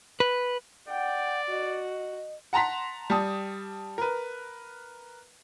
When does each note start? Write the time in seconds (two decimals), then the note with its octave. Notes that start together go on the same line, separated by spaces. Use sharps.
0.20 B4
0.88 D5 F#5 G5
1.49 F#4 D#5
2.53 F#5 A5 A#5 C6 B6
3.10 G3 A5 D#6
3.98 A#4 B4